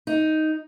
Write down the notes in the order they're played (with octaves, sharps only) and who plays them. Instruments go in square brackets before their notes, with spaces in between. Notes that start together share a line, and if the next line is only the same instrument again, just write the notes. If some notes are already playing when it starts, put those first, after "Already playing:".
[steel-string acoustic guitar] D#4